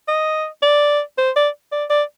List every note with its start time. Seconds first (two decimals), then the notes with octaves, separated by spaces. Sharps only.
0.08 D#5
0.62 D5
1.18 C5
1.36 D5
1.72 D5
1.90 D5